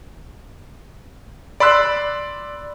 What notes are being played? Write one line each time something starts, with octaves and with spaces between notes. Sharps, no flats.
D5 B5 C6 E6 F#6